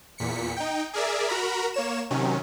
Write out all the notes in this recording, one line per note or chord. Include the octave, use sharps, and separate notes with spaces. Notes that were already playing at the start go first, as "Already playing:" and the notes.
E2 A#2 B6 C#7
D#4 G5
G#4 A#4 D5 E5
F#4 A#4 A#5 B5
A#3 C#5 E7
C3 D#3 F#3 C#4